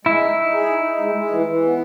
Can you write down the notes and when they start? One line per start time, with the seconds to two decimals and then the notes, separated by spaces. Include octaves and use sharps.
0.05 G#3 E4
0.21 D#4
0.37 D#4
0.53 G#4
0.68 D#4
0.84 D#4
1.00 G#3
1.15 G#3
1.31 E3
1.46 E3
1.63 B3